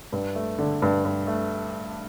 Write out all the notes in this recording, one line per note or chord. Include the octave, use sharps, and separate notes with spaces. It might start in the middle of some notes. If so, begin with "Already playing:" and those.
G2
A3
D3
G2
G2
A3